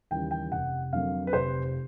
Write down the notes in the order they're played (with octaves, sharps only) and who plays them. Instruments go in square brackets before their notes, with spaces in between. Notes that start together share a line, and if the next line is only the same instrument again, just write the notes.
[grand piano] D#2 C#3 E3 G3 G5
G5
F1 F#5
F2 D3 F#3 A#3 F5
B4
F1 C5